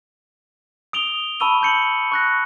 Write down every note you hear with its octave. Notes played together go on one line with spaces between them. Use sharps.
D#6 D7 F7 G7
A5 B5 C#6 E6 D#7 G7
A5 G6 C#7 F#7
C#6 F#6 A#6